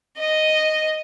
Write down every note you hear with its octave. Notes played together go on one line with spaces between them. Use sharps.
D#5